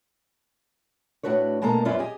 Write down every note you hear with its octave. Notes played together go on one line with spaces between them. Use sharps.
A2 D4 F#4 B4 C#5
B2 G#3 A#3 A4 A#5
F#2 B3 C#4 F4 D5 E5
G4 G#4 D#5 G#5